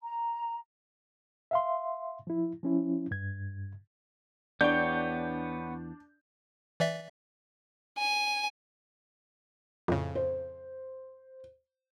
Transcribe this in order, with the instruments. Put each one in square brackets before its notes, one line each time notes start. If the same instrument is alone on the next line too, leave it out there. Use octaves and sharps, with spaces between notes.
[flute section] A#5
[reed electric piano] E5 F5 C6
F3 E4
F3 C#4 E4
G2 G#6
[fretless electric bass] E2 [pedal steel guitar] B3 C#5 G5 [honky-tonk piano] D4 [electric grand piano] G6
[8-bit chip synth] E3 D5 E5
[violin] G#5
[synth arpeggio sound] F2 A2 C#3
[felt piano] C5